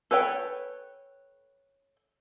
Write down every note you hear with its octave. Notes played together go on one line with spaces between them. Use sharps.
A4 B4 C#5 G5